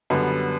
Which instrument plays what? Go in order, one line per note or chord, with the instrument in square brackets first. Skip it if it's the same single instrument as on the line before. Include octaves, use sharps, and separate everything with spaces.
[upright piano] F#2 D3 G3 B3